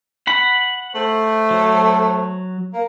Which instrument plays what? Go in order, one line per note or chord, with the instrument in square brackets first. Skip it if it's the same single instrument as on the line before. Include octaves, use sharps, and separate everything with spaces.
[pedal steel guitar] F#5 B5
[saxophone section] A3 C5
[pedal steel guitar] F#3
[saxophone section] A#3